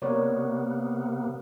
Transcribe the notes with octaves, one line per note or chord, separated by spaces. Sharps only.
C3 A#3 B3 A#4 C#5 D5